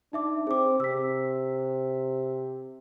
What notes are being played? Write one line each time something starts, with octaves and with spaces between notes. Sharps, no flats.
D4 D#4 E5 D6
C4 G#4 D6
C3 E6 B6